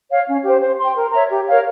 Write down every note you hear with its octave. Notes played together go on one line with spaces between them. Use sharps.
C#5 F5
C#4
G4 C5
C5
G5 C6
A#4
C#5 E5 A#5
G4
A#4 C#5 F5